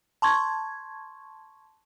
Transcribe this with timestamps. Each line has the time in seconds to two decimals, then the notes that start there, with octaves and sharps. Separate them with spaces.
0.22 A5 C6 C#6 G#6